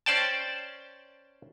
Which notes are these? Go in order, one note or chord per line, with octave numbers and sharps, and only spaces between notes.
C#4 C5 D5 G5 A5